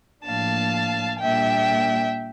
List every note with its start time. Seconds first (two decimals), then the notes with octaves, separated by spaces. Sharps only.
0.24 A2 F3 A#3 D4 F5 A5
1.19 A#2 G3 A#3 D4 E5 G5